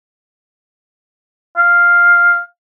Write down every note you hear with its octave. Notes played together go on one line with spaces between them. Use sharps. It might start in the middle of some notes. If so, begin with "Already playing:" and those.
F5